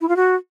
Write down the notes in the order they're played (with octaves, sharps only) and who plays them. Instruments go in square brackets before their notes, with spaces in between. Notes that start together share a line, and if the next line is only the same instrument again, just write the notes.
[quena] E4
F4
F#4